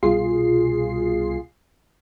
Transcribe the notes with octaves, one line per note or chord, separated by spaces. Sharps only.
C2 B2 F4 G#4 C7